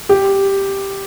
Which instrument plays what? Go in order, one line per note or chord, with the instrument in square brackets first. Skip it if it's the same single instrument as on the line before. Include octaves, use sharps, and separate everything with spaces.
[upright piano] G4